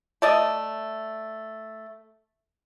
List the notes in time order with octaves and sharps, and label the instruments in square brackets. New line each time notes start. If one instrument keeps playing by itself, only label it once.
[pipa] A3 D5 D#5